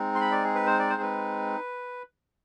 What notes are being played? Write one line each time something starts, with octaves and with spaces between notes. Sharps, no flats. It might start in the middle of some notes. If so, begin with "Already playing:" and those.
Already playing: G#3 C4 D#4
C6
B5
D5
G#4
B4
C5
D5
C5
G#4
B4